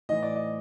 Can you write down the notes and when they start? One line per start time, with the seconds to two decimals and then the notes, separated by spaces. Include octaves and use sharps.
0.09 A2 E3 D#5
0.23 D5
0.36 D#5